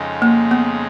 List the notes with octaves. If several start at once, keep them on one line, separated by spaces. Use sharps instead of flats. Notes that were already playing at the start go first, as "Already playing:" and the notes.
Already playing: F2 C#3 G#3 D#4
A#3
B3